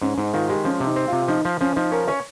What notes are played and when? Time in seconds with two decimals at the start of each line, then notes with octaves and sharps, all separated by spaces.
0.02 G#2 C#4
0.18 G#2 D#4
0.33 D#3 F4
0.49 G#3 G4
0.65 F3 C#4
0.80 C3
0.86 D#4
0.96 C4
1.08 C3 F4
1.28 F3 D#4
1.45 F3
1.61 F3 C#4
1.76 F3 D#4
1.92 C#4 A#4
2.08 C#4 C#5